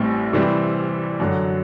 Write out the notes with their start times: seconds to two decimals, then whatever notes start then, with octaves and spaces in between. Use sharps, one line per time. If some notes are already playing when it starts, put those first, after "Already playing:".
Already playing: A1 A2 G3 C4
0.33 C3 E3 G3 C4 E4
1.20 F#2 D3 F#3